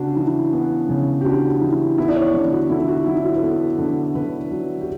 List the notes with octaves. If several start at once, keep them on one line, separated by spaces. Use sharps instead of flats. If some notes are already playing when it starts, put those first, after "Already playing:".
Already playing: C#3 B3 D4 F#4
E3
B3
C#3
G4
D4 F#4
E3
B3 E4
D5
C#5
D3 C#5
F#4
D3 E4
F#4
F#3 E4
F#4
B4
B3 A4
D3
D3 B4
F#3
G4